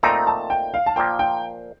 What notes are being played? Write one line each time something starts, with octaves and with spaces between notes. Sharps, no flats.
A#2 A3 C4 D#4 A#5
A5
G5
F5
A5
A#2 F3 A#3 G5
G5